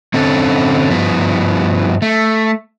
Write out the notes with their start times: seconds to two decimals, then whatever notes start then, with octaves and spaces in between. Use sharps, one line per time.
0.14 D3 C4 C#4 A4
0.90 G2 F3 B3
2.02 A3